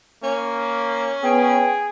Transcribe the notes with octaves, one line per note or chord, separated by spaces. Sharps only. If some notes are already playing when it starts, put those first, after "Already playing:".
A#3 C#4
B3 G#4 G5